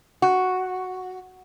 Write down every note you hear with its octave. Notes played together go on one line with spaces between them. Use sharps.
F#4